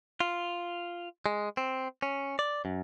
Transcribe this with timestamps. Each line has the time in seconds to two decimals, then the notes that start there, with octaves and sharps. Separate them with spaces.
0.20 F4
1.26 G#3
1.57 C4
2.02 C#4
2.39 D5
2.65 F#2